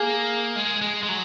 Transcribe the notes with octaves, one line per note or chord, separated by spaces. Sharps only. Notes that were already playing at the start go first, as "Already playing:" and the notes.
Already playing: A#3 G#4
G#3
G#3
G#3
F#3